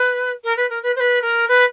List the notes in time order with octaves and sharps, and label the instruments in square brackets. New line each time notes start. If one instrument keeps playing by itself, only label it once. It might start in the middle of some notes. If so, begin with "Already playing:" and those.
Already playing: [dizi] B4
A#4
B4
A#4
B4
C5
B4
A#4
B4